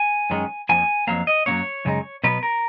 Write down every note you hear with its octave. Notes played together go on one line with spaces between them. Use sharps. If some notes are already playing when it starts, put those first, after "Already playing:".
Already playing: G#5
F#2 D#3 G#3 C#4
F2 F3 A#3 G#5
F2 D#3 F#3 A#3 F5
D#5
F#2 C#3 F#3 A#3 C#4 C#5
F#2 C#3 G#3 D#4
B2 F#3 B3 B4
A#4